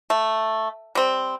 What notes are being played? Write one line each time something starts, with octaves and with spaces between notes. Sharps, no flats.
A3
G3 C4